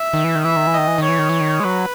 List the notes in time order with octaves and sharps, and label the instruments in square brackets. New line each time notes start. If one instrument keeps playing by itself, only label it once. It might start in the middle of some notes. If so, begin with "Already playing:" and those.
Already playing: [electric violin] E5
[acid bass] D#3
E3
D#3
[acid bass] E3 [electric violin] E5
[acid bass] D#3
E3
[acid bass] D#3 [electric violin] D#5
[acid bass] E3
D#3
[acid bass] E3 [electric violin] C#5
[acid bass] D#3
E3
D#3
G#3
[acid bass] F#3 [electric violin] B4